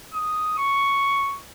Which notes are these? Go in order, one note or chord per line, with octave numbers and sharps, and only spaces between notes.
D#6
C#6